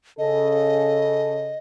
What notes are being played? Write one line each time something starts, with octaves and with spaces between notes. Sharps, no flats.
C#3 A4 D#5